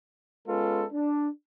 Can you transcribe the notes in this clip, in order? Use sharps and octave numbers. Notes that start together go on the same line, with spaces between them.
G#3 B3 C#4 F4 A4 B4
D4